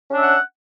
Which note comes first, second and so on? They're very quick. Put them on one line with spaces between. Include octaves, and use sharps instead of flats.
C#4 D4 E5 F#5